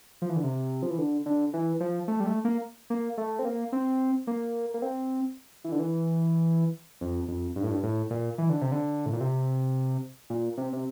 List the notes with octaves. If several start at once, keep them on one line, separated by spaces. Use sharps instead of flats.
F3
E3
D3
C3
F3
E3
D3
D3
E3
F3
A3
G3
A3
A#3
A#3
A3
C4
A#3
C4
A#3
A#3
C4
E3
D3
E3
F2
F2
G2
A2
G2
A2
A#2
E3
D3
C3
D3
A2
A#2
C3
A#2
C3
C3